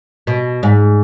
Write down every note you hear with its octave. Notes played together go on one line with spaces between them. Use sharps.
B2
G#2